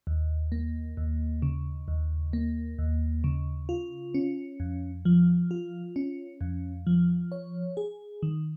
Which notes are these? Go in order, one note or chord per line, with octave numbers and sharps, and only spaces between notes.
D#2
A#3
D#2
C#3
D#2
A#3
D#2
C#3
F4
C#4
F2
F3
F4
C#4
F2
F3
C#5
G#4
D#3